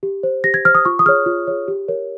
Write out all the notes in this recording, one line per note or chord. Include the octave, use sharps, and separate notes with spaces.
G4
C5
G4 A#6
G#6
C5 F6
D#6
F4 C#6
D#6
G#4 C#5 F6
F4
G#4 C#5
G4
A#4 C#5